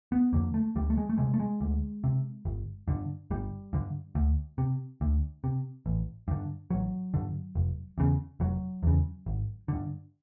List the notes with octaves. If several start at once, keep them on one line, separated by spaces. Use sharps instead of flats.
B3
F2 D3 A#3
A3
D2 G3
A3
G#3
A3
C3 G#3
A3
G#3
D2
C3
G1
G2 D3
G1 G3
G2 D3
D2
C3
D2
C3
A1
G2 D3
A1 F#3
G2 D3
F1
E2 C#3
F1 F#3
E2 C#3
G#1
G2 D3